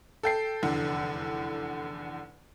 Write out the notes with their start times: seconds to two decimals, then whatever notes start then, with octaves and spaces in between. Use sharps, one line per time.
0.23 A4 G5 C7
0.63 F1 E2 D3